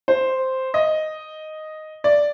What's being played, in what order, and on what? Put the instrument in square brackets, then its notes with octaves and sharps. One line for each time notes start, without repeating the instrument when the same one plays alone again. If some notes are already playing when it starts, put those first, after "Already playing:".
[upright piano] C5
D#5
D5